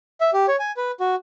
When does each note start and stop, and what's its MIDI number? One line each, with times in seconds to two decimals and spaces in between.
0.21 0.31 76
0.33 0.46 67
0.48 0.56 73
0.59 0.72 80
0.77 0.91 71
1.00 1.15 66